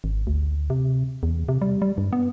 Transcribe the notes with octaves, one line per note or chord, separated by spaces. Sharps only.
G#1
D2
C3
E2
C3
G3
G3
G2
B3